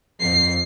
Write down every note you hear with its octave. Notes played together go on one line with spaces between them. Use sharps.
F2 C7